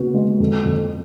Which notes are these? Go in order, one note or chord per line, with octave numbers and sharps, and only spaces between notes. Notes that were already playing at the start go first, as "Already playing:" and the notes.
Already playing: C#3 B3 F#4
G#3
F2
F2